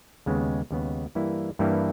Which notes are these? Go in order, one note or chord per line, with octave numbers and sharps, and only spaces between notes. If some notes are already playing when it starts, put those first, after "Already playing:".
D#2 C#3 G#3 B3
D#2 C#3 G#3 B3
G2 E3 G3 A#3 E4
G2 E3 G3 A#3 E4